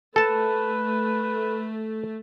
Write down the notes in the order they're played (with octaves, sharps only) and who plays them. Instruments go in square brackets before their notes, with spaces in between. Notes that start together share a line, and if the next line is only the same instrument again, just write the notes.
[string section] A3 [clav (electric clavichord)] A4 A5 [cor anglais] B4